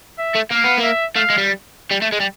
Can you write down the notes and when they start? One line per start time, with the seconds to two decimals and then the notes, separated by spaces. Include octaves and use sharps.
0.18 E5
0.35 A3
0.51 A#3 F5
0.64 B3
0.77 A#3
0.83 E5
1.16 A3 F5
1.30 G#3
1.38 G3
1.91 G3
2.02 A3
2.13 G#3
2.20 G3